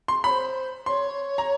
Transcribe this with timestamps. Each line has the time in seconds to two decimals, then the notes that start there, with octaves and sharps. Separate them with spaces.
0.08 C6
0.24 C5 C#5 B5
0.86 C#5 C6
1.38 A#5